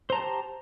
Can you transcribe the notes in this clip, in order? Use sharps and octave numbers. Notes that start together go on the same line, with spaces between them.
G4 C5 A5 A#5